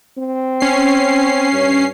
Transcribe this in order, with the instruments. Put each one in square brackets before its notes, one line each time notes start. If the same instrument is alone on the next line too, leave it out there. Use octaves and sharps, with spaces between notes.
[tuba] C4
[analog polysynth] C#4 C7
[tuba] G2